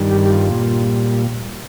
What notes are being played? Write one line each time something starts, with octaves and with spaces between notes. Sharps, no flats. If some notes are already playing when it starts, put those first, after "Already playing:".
Already playing: G2 D#3 G3
G4
G4
F4
A#2 G3